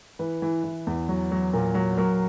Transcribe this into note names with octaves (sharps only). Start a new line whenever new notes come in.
E3 B4
E3
E3
E2
F#3
F#3
A#2 A#4
F#3
F#3 A#4